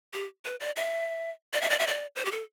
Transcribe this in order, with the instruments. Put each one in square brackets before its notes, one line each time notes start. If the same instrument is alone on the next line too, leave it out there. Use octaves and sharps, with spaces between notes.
[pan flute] G4
B4
D5
E5
D5
E5
D5
E5
D5
C5
G4
A4